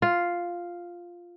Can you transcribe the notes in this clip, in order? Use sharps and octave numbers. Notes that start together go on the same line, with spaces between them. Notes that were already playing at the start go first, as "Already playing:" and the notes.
F4